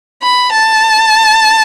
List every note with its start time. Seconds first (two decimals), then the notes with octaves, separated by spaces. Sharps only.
0.23 B5
0.53 A5